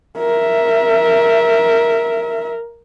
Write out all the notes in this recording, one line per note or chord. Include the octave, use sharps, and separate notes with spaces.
A#4 E5